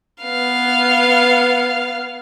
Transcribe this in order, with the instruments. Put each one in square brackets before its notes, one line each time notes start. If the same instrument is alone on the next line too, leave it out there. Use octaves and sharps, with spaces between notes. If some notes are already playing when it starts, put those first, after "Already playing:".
[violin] B3 F5